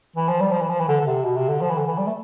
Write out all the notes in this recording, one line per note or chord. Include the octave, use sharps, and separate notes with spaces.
E3
F3
G3
F3
E3
F3
E3
D3
D3
C3
B2
C3
D3
F3
E3
D3
E3
G3
A3